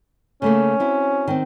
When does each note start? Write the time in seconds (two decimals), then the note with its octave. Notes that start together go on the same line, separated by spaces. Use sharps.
0.42 C#3 A3 A#3 C#4
0.80 C4 E4 F#4
1.28 D#3 C4